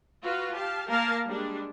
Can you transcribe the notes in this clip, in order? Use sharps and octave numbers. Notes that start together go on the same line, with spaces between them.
F4 F#4 B4 F5
G4 F5 A5
A#3 A#4 F5 A5 A#5
G3 G#3 D4